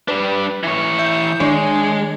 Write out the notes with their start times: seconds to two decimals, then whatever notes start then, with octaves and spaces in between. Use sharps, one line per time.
0.08 G3 D4 B4
0.63 E3 C#5
0.99 E5 G6
1.40 D#3 G#3 D4 C#5